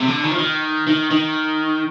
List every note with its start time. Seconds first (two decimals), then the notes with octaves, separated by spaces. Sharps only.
0.01 C3
0.08 D3
0.24 D#3
0.31 F3
0.39 D#3
0.87 D#3
1.11 D#3